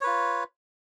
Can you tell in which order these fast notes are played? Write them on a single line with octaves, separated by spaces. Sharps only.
C#5 B4 F4